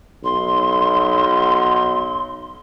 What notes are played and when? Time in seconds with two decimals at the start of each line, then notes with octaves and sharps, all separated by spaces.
0.24 B1 C6